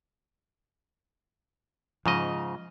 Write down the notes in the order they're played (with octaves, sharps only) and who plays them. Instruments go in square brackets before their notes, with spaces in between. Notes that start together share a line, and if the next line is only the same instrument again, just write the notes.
[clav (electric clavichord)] G#2 C#3 D#5 [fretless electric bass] F3